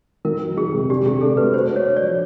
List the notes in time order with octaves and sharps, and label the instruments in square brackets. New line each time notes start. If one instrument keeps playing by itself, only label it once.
[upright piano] D#3 [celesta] A#4
[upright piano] F#3
[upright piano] D#3 [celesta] G#4
[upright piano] C3
[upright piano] D4 [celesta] G4
[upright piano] C3 [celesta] G#4
[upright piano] D4 [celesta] A4
[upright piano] A3 [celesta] B4
[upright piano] F#4 [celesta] C5
[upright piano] D4
[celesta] C#5
[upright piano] D4
[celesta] D5
[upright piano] F3